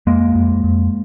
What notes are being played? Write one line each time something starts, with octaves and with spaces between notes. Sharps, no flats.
F2 G#3 A#3
F2
F2